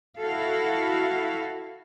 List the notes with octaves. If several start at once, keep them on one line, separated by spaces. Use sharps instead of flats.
E4 F#4 A4 F5